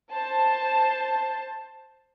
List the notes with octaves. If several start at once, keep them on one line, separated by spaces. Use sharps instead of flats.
C5 A5